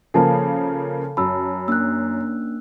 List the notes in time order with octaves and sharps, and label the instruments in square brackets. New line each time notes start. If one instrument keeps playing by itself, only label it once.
[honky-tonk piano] C#3 F3 A#3 [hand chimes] A4 [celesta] G#5 A5
[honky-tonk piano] F#2 [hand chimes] A5 [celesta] B5 E6
[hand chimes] A#3 C#4 D4 [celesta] E6 F#6